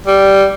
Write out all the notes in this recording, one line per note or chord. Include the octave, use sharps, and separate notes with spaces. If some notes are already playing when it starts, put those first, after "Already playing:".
G3